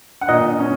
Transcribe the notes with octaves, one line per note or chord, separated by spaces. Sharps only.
F#5
A#2 D#5
C#4